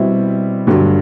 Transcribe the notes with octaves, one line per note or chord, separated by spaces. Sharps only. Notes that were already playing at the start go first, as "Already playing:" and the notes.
Already playing: B2 G3 C4 E4
G2 D3 F#3